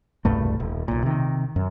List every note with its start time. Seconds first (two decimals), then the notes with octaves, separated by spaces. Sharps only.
0.25 E1 C2 G2 A3
0.60 D#1
0.88 B1 A#2
1.03 C3 D#3
1.56 F#2